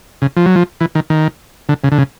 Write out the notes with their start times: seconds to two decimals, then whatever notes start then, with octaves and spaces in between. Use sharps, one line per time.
0.22 C#3
0.37 F3
0.46 F#3
0.56 F3
0.81 E3
0.95 D#3
1.10 D#3
1.69 D3
1.84 C#3
1.92 D3
1.98 C#3